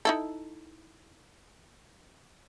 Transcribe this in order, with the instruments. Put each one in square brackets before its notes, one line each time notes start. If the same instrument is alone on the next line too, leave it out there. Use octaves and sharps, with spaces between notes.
[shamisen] D#4 E4 A4